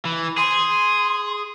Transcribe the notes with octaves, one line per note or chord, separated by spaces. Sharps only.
E3
G#4 C6